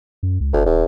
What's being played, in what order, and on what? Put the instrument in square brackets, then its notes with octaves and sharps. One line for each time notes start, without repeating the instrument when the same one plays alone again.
[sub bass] F#2
C#2
[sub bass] F#1 [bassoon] D2
[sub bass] D1 [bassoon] E2